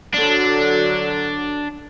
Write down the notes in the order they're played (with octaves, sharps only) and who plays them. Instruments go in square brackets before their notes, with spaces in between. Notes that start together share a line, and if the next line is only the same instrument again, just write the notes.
[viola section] D3 F#3 [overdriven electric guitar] D4